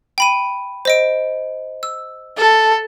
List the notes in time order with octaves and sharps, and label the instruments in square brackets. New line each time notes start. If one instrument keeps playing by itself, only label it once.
[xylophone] G5 B5 D#7
C5 D#5 D7
E6
[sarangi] A4